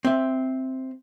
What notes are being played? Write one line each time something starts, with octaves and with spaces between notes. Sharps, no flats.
C4 E5